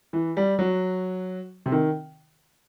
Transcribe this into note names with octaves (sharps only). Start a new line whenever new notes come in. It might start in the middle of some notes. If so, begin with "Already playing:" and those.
E3
G3
F#3
C3
D#3